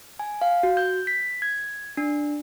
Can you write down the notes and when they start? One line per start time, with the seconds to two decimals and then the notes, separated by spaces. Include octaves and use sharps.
0.19 G#5
0.41 F5
0.63 F#4
0.77 G6
1.07 B6
1.42 G#6
1.97 D4